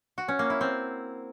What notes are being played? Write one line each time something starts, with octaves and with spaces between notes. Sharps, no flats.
F#4
C#4
A#3
E4
C4